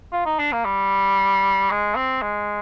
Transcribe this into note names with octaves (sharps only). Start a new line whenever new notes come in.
F4
D#4
D4
A#3
G3
G#3
C4
G#3